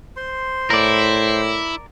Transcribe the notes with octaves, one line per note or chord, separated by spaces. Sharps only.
C5 C6
A2 E4 A#4 D5